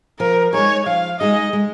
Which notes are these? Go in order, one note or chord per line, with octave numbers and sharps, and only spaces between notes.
F3 A#4
G#3 D#4 G#4 C#5
F3 F5
G#3 D#4 G#4 D#5
G#3